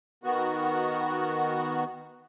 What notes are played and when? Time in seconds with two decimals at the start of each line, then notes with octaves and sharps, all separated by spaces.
0.24 D#3 B3 F#4